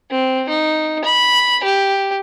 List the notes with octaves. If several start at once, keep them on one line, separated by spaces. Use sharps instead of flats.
C4
D#4
B5
G4